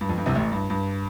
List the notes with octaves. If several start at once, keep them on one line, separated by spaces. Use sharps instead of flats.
G2
F2
G2
C2 C3
A1 A2
G2
G2